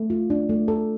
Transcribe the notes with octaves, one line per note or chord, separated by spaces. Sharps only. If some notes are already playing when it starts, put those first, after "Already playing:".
Already playing: A3
F4
D4
A3
A4